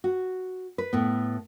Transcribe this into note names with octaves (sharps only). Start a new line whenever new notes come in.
F#4
B4
A2 B3